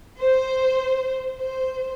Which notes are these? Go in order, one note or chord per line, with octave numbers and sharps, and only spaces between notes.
C5
C5